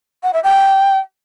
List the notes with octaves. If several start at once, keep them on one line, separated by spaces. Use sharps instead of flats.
F#5
E5
G5